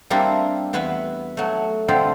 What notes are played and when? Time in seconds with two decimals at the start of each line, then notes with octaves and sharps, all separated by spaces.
0.10 G3 A#3 C4 D4 E4
0.73 E2 B3 E4 B4 E5
1.37 F#3 A3
1.88 D3 G3 C4 E4 F4 G4